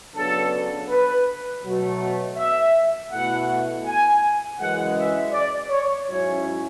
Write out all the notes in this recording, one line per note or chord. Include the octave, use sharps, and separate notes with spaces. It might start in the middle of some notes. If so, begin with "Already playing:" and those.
C#3 F#3 B3 D4 A4
B4
B2 F#3 A3
E5
B2 A3 E4 F#5
G#5
F#2 C#3 E3 G#3 F#5
E5
D5
C#5
G#2 F#3 C#4 E4 C#5